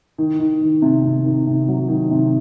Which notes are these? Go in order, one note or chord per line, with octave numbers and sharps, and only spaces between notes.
D#3
D#3
D#3
C3
C3
D#3
C3
F#3
D#3
C3